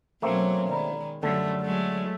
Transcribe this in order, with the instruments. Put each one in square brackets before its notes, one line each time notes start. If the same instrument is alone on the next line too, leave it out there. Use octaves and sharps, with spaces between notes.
[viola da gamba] B2 F#3 C#4 [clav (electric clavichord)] A3 A#3 C4 [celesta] F5
[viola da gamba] D#3 G#3 [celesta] D5 A#5 B5
[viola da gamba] F#2 G3 [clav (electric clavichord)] D3 [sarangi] A3 [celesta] A5
[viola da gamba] F#3 G#3 [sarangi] A3